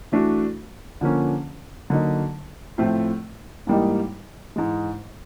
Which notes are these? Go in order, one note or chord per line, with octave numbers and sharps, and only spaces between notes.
E3 A3 D4 F#4
D3 F3 A#3 C#4
D3 F#3 A#3 D#4
A2 F3 A3 C4 F4
G#2 E3 G3 A#3 D#4
G#2 E3 G#3